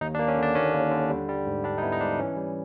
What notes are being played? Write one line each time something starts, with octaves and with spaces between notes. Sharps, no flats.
D#2 D#4
D4
A#3
C#4
D3 D4
D#2 C#4
D#2
D3
G3
G3
G#2
G3 D4
D#4
B3 E4
D#4
G#2 D4
E3 C#4
G3